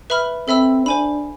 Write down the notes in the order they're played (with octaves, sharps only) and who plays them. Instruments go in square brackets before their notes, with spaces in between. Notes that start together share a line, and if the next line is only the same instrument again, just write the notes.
[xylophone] B4 E5 B5 F6
[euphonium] C4 [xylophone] A4 E5 B5 E6
[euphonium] D4 [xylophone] C5 G#5 B5